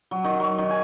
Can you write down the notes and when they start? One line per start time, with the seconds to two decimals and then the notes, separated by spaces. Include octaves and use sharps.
0.11 F#3
0.24 D#3
0.40 F#3
0.58 D#3
0.71 G#5